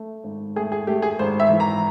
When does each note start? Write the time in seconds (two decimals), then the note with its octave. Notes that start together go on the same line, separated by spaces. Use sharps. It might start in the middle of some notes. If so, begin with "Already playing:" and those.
Already playing: A3
0.24 G#1
0.56 A3 G#4
0.72 G#4
0.87 A3 G4
1.02 G#4
1.19 G#1 C5
1.40 E5
1.50 E3
1.60 A#5